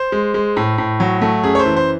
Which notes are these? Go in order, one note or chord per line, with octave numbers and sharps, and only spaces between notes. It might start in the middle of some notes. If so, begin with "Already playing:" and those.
Already playing: C5
G#3
G#3
A2
A2
F#3
A3
F#2 G#4
C#5
C5
E3
C5